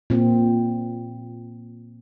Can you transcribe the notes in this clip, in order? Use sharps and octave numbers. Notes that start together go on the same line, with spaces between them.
A#2 C4